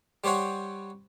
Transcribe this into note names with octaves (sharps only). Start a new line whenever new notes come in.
G3 G4 C5 C#5 F#5